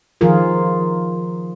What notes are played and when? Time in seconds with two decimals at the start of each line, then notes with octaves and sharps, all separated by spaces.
0.21 D#3 F3 F4 G#4 A#4